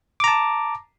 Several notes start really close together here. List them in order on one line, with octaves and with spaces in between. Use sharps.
D6 A#5 A5